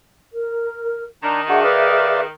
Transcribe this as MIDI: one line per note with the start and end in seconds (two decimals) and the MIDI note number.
0.32 1.04 70
1.23 2.30 51
1.23 1.42 62
1.23 1.41 82
1.49 1.63 62
1.49 1.63 66
1.49 2.22 68
1.49 2.22 76
1.49 1.60 78
1.64 2.24 71
1.64 2.21 74
1.64 2.21 77